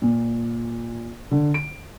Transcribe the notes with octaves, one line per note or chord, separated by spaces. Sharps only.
A#2
D3
D7